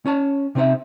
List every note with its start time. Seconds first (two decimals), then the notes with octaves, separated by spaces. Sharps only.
0.06 C#4 C#5 A5
0.55 C3 C4 D#4 C5 E5